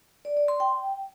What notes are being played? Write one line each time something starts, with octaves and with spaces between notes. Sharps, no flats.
D5
D5
C6
G5